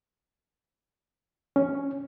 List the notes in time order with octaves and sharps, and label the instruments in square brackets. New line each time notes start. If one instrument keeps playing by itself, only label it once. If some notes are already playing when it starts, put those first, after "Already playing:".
[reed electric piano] C#4